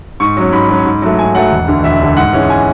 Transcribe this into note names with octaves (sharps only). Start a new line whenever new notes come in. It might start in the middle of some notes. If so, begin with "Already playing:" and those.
G#2 C#6
F#3 C#4
G#2 B5
F#3 C#4
G#2
F#3 A3
G#2 G#5
F#3 A3 F#5
E1
D2 D3
E1 E5
D2 D3
G#2 F#5
E3 G#3 C#4
G#5